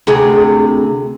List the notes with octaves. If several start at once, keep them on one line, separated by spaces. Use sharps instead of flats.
D2 C3 G#4